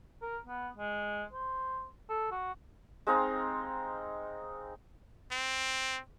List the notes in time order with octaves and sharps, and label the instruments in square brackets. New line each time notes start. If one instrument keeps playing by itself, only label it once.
[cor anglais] A#4
B3
G#3
C5
A4
F#4
[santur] G#3 C4 D#4 F5
[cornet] C4